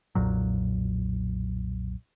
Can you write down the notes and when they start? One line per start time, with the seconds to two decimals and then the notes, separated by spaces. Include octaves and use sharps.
0.15 B1 F2 A#2 F#3